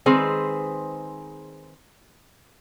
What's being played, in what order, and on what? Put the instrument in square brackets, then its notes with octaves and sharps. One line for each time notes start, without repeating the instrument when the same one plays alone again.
[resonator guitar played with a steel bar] D#3 G#3 C4 G#4 B4 C5